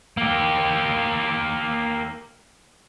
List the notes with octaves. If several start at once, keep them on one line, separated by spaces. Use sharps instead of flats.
A#3 G4